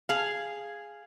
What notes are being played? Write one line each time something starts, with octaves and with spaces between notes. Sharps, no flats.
G#4 F5